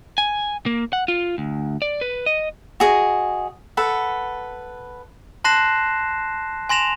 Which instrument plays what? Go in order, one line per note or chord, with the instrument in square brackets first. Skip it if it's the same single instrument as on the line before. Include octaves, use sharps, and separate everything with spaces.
[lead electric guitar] G#5
A#3
F#5
F4
D2
D5
B4
D#5
[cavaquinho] F#4 G#4 D#5
A4 B4 F#5
[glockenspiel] A5 C6 F#6 A#6 C7 E7
G#5 C6 A#6 E7 F7